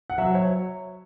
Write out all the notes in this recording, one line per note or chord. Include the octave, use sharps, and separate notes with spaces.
F#5
F#3 E5
C#5